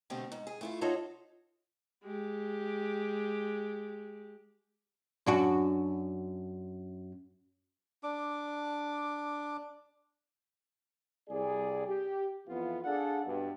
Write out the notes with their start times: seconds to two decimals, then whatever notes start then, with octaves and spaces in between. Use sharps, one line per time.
0.10 B2 D3 A3 C4 G4
0.32 G#2
0.47 G#4
0.61 A3 E4 F4
0.81 D#4 F4 F#4 A4 C#5 E5
2.04 G#3 G4
5.26 F#2 D4 F#4
8.03 D4 D6
11.29 C2 G#4 D5
11.87 G4
12.48 F2 E3 B3 F4
12.84 D4 G#4 A4 D5 F5 F#5
13.26 G2 B2